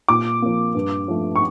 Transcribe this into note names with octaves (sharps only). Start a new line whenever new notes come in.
A#2 D6
F3 A#3
G2
F3 A3
C#6